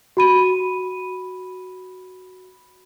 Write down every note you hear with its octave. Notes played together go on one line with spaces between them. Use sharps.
F#4 B5 D#7